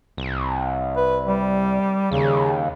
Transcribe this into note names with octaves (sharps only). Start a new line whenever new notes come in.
C2
B4
G3
D#2 C#3